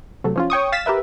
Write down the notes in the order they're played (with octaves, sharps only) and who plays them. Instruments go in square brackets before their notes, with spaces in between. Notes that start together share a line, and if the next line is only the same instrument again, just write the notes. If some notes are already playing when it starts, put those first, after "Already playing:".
[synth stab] C3 F#3 A3
F3 C#4 F4
C#5 G5 C#6 D#6
F5 A6 B6 E7
G4 A#4 B4 E5